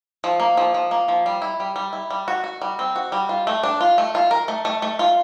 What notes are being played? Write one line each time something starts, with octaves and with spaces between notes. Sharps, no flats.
F3
A#3
F3
F3
A#3
F3
G3
E4
G3
G3
E4
G3
F#4
F#4
G3
C4
F#4
G3
F4
A3
D4
F4
A3
F4
A#4
A3
A3
A3
F4